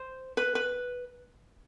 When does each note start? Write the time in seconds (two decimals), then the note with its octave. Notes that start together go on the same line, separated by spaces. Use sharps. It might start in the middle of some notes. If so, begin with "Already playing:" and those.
Already playing: C5
0.37 B4
0.55 B4